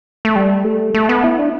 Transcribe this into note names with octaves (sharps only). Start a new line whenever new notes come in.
A3
G3
A3
A3
B3
E4
D4